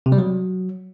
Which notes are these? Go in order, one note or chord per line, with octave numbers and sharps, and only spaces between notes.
C3
G3
F#3